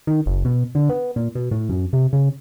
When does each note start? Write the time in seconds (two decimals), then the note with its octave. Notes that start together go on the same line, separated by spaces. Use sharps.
0.07 D#3
0.26 F#1
0.45 B2
0.75 D3
0.89 B3
1.16 A#2
1.35 B2
1.51 A2
1.69 F#2
1.93 C3
2.13 C#3